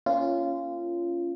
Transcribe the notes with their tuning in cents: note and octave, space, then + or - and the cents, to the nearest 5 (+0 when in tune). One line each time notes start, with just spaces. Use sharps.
A#3 +0 C#4 +0 F4 -20